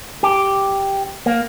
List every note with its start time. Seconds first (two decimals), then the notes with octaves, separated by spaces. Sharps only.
0.23 G4
1.26 A#3